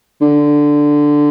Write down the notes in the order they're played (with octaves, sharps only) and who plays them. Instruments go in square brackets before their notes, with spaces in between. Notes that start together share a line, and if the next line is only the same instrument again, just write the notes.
[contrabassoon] D3